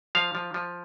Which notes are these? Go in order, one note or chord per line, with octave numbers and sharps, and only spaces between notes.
F3 F5
F3
F3